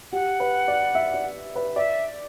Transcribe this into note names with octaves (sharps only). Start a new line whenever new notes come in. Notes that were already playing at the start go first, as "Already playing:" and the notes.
G4 F#5
B4
D5
E5
D5
B4
D5 E5